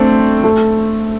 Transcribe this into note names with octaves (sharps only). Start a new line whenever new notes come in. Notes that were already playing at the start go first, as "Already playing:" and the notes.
Already playing: A3 C4 D4
A3